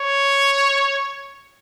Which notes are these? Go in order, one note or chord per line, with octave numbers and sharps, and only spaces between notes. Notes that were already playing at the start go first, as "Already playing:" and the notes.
Already playing: C#5